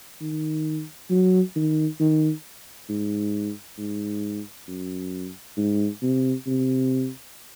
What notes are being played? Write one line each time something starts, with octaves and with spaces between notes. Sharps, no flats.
D#3
F#3
D#3
D#3
G#2
G#2
F#2
G#2
C3
C3